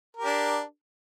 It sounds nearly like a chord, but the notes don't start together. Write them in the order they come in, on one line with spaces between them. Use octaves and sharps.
A#4 G4 D4